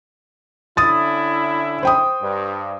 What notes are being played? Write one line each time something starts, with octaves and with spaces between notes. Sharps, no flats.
D3 C#4 E4 D#6 A6
C5 G5 D#6
G2